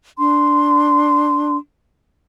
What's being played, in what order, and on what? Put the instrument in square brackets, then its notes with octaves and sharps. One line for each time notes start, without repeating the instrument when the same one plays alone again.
[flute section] D4 C6